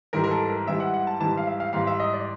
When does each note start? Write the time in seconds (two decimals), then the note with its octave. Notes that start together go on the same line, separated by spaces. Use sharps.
0.13 G#2 E3 G3 A#4
0.24 A#4
0.31 A4
0.49 A#4
0.67 G#2 E3 G3 E5
0.80 F#5
0.94 F#5
1.07 A5
1.20 G#2 E3 G3 A5
1.37 F5
1.47 E5
1.60 F5
1.73 G#2 E3 G3 F5
1.87 E5
2.00 D#5
2.14 D5